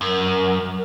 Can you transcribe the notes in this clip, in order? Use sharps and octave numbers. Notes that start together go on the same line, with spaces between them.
F#2 A#4